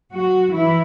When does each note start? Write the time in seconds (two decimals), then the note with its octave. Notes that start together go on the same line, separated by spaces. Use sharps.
0.12 F#3 F#4
0.53 E3 E4